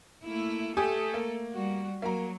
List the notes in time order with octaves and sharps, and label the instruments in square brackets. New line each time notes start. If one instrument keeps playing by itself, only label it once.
[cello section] A3 A#3 E4
[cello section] A3 A4 [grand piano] G4 G#5 D#6
[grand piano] A#3
[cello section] G3 F#4
[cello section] F#3 [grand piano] A#3 A#5